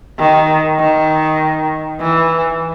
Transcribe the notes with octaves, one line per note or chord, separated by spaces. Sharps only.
D#3
D#3
E3